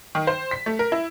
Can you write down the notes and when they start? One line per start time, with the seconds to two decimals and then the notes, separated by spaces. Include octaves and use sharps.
0.15 D#3
0.27 C5
0.51 B6
0.66 A3
0.79 A#4
0.92 E4